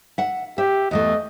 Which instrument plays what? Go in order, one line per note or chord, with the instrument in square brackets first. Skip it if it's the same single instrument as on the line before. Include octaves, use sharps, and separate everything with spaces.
[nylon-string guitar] E5 F#5
[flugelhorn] G4 [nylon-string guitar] E5
[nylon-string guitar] E2 E3 A3 [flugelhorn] D#5